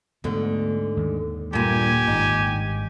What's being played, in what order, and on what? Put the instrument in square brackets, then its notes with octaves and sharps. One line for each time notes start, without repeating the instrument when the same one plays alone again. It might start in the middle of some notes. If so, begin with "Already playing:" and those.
[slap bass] D2 A3 B3 [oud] G#2 D3
[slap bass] D#2
[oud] G2 A#2 [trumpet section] G4 G#5
[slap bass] G#1 G2 [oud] D#4